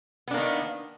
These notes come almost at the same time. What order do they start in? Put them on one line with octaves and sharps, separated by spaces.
B3 D4 A#3 D#3